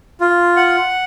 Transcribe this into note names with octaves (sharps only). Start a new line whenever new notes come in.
F4
F#5